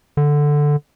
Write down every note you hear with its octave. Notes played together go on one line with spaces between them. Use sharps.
D3